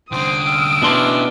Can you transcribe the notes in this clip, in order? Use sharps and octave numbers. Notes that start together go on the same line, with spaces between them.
C2 D3 C4 D#6 D7
G5 E6 F6
B2 C#4 D4 E4 C6